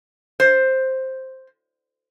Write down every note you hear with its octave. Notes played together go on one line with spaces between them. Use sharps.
C5